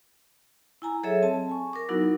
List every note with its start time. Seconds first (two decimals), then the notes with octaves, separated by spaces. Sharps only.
0.82 E4 G#5 A#5
1.03 F#3 G#4 A4 C#5 D#5 E5
1.22 C4 A5
1.49 G#5 C#6
1.73 A#4 D6
1.89 F#3 B3 D#4 E4 F#4 A#4